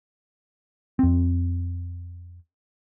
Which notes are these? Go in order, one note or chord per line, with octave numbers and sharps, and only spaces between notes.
F2 C4